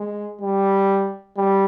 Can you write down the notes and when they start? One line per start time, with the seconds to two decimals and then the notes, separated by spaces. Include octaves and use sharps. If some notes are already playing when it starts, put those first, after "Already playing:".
Already playing: G#3
0.42 G3
1.37 G3